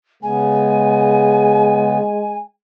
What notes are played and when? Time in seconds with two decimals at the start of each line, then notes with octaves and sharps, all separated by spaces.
0.23 C#3 G#3 B3 G#5